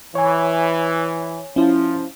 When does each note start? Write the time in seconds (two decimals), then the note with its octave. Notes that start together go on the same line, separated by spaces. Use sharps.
0.15 E3 C#5 G#5
1.56 F3 C#4 E4